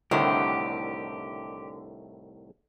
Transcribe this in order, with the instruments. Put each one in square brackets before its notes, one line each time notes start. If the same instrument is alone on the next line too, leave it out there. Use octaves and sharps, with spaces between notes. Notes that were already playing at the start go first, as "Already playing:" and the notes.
[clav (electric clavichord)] C2 A2 D#3 [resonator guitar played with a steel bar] D3 [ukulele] E4 F#5 [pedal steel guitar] G4